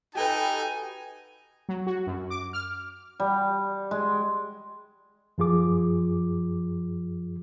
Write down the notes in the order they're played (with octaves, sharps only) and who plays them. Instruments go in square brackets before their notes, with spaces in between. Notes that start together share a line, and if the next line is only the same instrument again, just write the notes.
[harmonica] D#4 [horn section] F#4 G#5 [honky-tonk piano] G4 A4 B4 [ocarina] G5
[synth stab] F#3
F#4
F#2
D6
F6
[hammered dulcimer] G3
G#3
[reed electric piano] F#2 F3 F4 G#4 D6